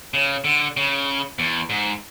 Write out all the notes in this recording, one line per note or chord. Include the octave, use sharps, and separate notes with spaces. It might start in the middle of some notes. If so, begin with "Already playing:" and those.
C#3
D3
C#3
E2
G#2